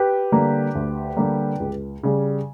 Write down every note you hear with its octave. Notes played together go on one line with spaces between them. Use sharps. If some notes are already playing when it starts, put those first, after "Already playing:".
Already playing: G4 B4
D3 G3 A#3
D2
D3 G3 A#3
C#2
C#3 G3